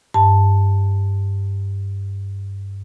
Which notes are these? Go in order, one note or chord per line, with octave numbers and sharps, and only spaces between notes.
G2 A5